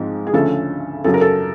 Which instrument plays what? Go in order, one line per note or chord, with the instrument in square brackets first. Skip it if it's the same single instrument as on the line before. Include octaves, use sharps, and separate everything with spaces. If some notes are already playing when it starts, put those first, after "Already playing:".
Already playing: [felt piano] G#2 F3 G#3 C4
G#4
D2 C#3 F3 A3 C#4 A4
F#2 C#3 F#3 A4
A#4
A4